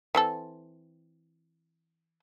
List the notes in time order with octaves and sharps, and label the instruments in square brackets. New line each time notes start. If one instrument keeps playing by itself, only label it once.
[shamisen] E3 C4 A4